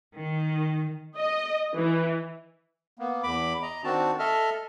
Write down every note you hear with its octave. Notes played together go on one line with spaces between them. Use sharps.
D#3
D#5
E3
A#3 B3
E2 B5 D6
D#5 A#5
D#3 C4 D4 F#4 A5
A4 D#5 E5 A5 F6